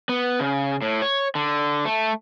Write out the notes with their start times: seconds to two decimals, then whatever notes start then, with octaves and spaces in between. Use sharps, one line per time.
0.09 B3
0.40 C#3
0.82 A2
1.02 C#5
1.35 D3
1.85 A3